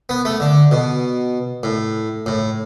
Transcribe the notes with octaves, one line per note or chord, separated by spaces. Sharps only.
B3
A3
D3
B2
A2
A2